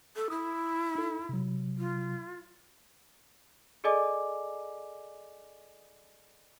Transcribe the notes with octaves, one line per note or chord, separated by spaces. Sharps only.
A4
E4 D#6
D#4 A4
C3 F#3
F4
G#4 A4 D5 D#5 G#5 D6